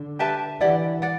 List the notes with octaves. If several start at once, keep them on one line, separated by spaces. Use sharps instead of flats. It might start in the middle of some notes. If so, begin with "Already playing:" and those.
Already playing: D3
G4 B4 E5 A5
E3 E4 G4 D5 F#5
D5 F#5